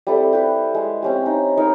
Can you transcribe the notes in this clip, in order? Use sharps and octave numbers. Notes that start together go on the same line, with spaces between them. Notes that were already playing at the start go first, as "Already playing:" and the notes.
G3 C4 E4 A4
G4 B4
G#3
C4 C#4 G4
D#4
D#4 A#4 C#5